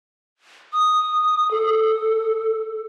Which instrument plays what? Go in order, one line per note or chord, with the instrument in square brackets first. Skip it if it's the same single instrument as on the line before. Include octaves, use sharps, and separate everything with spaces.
[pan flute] D#6
A4